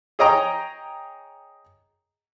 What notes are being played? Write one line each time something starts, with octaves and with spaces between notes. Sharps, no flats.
G#4 C#5 D#5 G5 A#5